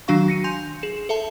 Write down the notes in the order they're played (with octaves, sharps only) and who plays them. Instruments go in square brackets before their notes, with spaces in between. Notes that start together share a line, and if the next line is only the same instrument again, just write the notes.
[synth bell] D#3 F#3 D4 F#4 F5 C#6
A#6 C#7 D#7
G#5 C6 G6 F7
G#4 E7
A4 E5 A5